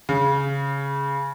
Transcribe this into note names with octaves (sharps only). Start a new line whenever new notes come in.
C#3